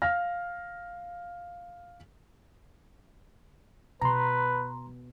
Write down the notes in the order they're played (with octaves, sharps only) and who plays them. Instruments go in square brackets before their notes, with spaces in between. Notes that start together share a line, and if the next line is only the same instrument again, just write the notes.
[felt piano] F5 F6 A#6
[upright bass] B2 [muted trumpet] B4 [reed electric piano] A#5 C6